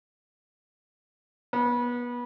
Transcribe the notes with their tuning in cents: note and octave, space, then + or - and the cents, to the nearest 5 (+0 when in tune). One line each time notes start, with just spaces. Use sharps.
B3 -25